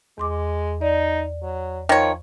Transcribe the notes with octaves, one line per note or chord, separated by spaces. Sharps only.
E2 G#3 C6 D6
D#4 D5
F#3
D#3 F3 C#5